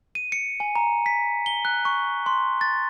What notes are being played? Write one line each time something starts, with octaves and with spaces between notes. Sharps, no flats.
D#7
C#7
G#5
A#5
B6
G7
F#6
C#6
C6
A6